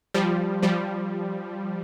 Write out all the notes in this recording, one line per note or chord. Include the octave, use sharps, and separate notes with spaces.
F3 G3
F3 G3